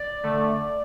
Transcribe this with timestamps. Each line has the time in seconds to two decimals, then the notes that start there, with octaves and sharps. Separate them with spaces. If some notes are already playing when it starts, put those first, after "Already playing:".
Already playing: D5
0.23 D3 A3